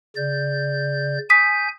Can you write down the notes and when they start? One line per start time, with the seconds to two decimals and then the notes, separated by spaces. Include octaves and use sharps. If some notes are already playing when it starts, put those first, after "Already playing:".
0.16 C#3 D5 G6
1.30 G#5 D#6 G6 B6 D#7